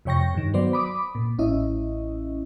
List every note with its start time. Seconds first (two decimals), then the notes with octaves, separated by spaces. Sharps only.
0.05 F2 C3 C#5 G5 C#6 A#6
0.34 G2 D#3
0.53 F#3 B3 C5 D5
0.73 B5 D6 D#6
1.15 A#2
1.38 A1 C#4 E4 D#5